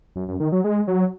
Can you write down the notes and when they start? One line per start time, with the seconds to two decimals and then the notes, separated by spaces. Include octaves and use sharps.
0.16 F#2
0.28 F#2
0.40 D#3
0.52 F#3
0.64 G#3
0.87 F#3